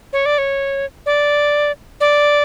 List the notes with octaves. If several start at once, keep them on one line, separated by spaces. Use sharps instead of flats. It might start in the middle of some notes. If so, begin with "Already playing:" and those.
C#5
D5
C#5
D5
D5